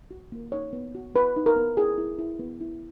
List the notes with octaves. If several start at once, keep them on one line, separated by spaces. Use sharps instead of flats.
F#4
A#3
D#4 C#5
B3
F#4
B3 B4
D#4
A#4
B3
E4 G#4
E4
E4
B3
E4